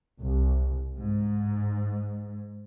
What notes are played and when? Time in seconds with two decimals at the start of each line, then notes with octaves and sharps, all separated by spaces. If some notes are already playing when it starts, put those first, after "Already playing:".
0.19 C2
0.99 G#2